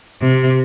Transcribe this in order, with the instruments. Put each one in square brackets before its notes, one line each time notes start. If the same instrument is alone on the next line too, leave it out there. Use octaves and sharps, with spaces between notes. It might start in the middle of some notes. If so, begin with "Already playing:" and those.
[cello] C3